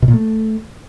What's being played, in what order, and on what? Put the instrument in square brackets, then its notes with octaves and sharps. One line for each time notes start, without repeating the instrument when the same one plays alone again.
[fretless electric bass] B2
A#2
A3